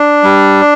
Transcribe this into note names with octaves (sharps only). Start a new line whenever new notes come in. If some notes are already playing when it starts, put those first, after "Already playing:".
Already playing: D4
G3